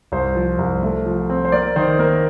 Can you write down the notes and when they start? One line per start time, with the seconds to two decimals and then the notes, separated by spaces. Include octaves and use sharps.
0.12 C2 C5
0.35 F3
0.58 C2
0.83 A3
1.06 F3
1.30 C4
1.45 C5
1.52 A#3 D5
1.76 D#3 C5
1.99 A#3 A#4